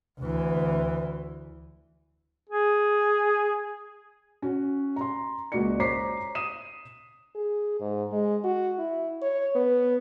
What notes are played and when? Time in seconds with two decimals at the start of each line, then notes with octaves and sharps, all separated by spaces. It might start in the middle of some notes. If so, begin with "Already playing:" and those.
0.21 D2 E3
2.50 G#4
4.42 C#4 F#4
4.96 A#5 C6
5.52 C#2 A#3 F#4 D5 C#7
5.80 C5 C#5 A#5 D6 B6 C7
6.35 D#6 D#7 E7
7.36 G#4
7.80 G#2
8.12 G#3
8.44 F#4
8.78 E4
9.22 C#5
9.56 B3